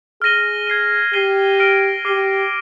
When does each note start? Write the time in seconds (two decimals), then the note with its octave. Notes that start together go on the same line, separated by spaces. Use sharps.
0.22 G#4 F6 A#6 D#7 G7
0.67 G#6 C7 D#7
1.13 G4 F6 G#6 C7 D#7 G7
1.59 F6 A#6 D7 G7
2.05 G4 D6 F6 C7 D#7 G7